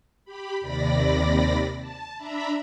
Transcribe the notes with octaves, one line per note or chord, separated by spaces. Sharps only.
G4 B5
D#2 C3 D5 B5 A#6
A5
D4 E5 A#5 B5